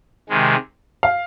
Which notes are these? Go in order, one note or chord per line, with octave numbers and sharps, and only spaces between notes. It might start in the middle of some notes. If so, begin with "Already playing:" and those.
C3 D#3 G#3
F5